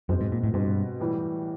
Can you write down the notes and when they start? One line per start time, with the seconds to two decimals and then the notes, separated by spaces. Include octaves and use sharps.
0.09 F#2 B2 G#3 C4
0.21 G#2
0.32 A#2
0.43 A2
0.54 G2 B2 G#3 C4
1.00 A2 E3 G3